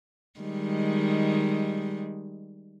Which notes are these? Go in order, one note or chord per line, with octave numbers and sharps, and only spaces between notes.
D#3 G3 G#3